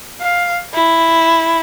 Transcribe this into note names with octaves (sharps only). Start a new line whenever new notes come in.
F5
E4